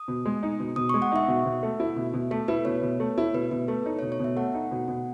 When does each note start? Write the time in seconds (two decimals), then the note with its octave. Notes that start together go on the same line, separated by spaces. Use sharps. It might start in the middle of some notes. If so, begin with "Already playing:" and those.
Already playing: D#6
0.08 B2
0.26 G#3
0.43 D#4
0.60 B2
0.76 B2 D#6
0.89 G#3 C#6
1.02 F#5
1.12 D#4 E5
1.28 B2
1.45 B2
1.63 A3
1.80 E4
1.96 B2
2.13 B2
2.31 A3 A4
2.48 E4 B4
2.65 B2 C#5
2.83 B2
3.00 A3
3.18 E4
3.34 B2 B4
3.51 B2 B4
3.68 A3 A4
3.85 D#4 C#5
3.99 B2 C#5
4.12 C#5
4.20 B2 E5
4.36 A3 F#5
4.54 D#4
4.71 B2
4.88 B2